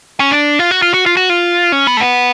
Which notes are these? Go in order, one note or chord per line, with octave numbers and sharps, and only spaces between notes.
C#4
D4
F4
F#4
F4
F#4
F4
F#4
F4
C#4
B3
A3
B3